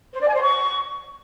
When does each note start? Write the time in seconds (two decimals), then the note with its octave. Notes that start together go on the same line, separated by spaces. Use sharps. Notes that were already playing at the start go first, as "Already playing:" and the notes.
0.13 C5
0.20 D5
0.27 G#5
0.34 C5
0.41 C#6